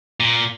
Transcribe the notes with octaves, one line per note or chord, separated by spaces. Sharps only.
A#2